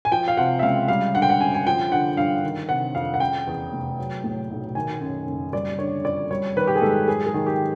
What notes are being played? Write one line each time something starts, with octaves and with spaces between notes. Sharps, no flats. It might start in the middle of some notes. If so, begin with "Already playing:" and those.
G#5
F3 G5
F5
C3 F#5
E5
C#2 F5
G3 F5
D3 F#5
G5
F#5
F#2 G#5
G#5
F3 G5
D3 F#5
G2 F5
D#3
C3 F#5
F2 F5
F#5
C#3 G5
E2
F1
F#3
A2
B1
D#3 G#5
F#2
F#1
G3 D5
D3 C#5
F2 D5
G3 C#5
D#3 B4
G4
G#4
G#2 A4
F#3 G#4
G#4
D#3
G4